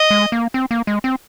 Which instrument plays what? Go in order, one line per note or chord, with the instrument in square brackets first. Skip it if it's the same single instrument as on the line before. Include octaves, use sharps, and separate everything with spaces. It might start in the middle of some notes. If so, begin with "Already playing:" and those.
Already playing: [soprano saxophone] D#5
[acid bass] G#3
A#3
C4
A#3
G#3
C4